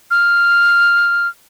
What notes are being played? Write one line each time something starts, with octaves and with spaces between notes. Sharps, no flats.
F6